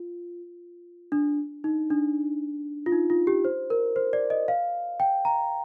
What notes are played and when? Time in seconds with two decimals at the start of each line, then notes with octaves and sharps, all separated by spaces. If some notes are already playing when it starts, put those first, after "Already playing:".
Already playing: F4
1.12 D4
1.64 D#4
1.90 D4
2.86 F4
2.92 D#4
3.10 F4
3.27 G4
3.45 C5
3.70 A#4
3.96 C5
4.13 D5
4.30 D#5
4.48 F5
5.00 G5
5.25 A#5